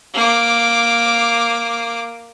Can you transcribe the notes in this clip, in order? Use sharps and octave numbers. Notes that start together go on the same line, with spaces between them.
A#3 D6